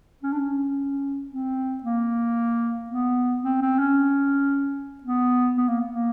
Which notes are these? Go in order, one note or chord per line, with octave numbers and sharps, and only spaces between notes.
C#4
D4
C#4
C4
A#3
B3
C4
C4
C#4
B3
B3
A#3
A#3